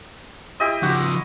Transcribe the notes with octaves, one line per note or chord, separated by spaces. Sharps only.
E4 G4 D#5
C#3 F3 F#4